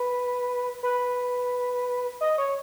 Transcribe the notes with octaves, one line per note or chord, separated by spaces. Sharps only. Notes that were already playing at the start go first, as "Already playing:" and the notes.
Already playing: B4
B4
D#5
C#5